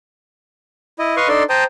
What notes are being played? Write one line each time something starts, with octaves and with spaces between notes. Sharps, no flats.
E4 D#5
B4 D#5 F5 C6 C#6
D4 D#4 A4 D5 C6
C5 G5 A5 A#5 D#6